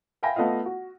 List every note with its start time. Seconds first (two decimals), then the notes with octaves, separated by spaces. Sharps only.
0.23 E5 F5 G5 G#5 B5 A#6
0.36 A3 B3 F4 D#5 F5
0.66 F#4